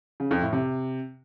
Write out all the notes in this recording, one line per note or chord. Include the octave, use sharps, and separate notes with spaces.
C#3
F2
A2
C3